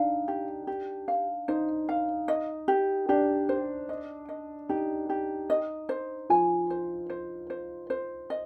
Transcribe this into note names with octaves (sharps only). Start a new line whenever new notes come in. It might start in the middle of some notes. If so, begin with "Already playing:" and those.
Already playing: D4 D#4 F5
G4
G4
F5
D#4 C5
F5
D#5
G4
D4 G4
C5
D#5
D#5
D#4 G4
G4
D#5
C5
F3 F4 G#5
C5
C5
C5
C5
D#5